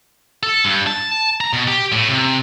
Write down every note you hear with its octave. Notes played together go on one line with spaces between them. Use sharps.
A4
G2
A5
A#5
B2
G4
A2
C3